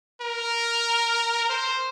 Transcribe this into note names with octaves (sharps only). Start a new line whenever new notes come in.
A#4
C5